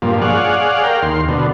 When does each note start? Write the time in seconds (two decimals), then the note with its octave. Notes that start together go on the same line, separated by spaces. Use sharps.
0.02 G2 A#2 F3
0.22 G#4 C#5 D5 F5 F#5
0.83 A#4 F5 G5
1.02 D#2 C6
1.28 B2 D3